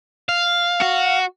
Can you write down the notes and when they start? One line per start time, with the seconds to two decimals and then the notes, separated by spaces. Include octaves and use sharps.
0.29 F5
0.82 F#4